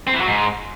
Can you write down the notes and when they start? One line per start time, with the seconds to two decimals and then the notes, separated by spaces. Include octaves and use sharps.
0.07 C4
0.14 E3
0.21 F#3
0.27 G#2